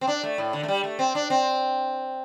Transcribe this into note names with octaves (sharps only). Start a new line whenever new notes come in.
C4
D4
A3
A2
D3
A3
G3
A3
C4
D4
C4